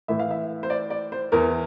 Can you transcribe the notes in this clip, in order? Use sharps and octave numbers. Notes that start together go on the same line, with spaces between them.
A2 E3 E5
F5
E5
C5
D5
D5
C5
E2 E3 A#4